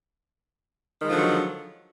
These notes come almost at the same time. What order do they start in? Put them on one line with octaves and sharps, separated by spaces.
D#3 G#3 F3 D3 F#3